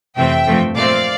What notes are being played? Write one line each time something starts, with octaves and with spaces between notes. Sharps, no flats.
F2 C3 E3 A3 C4 E5 G5
G2 F3 A3 C4
A#2 A3 C4 D5 F5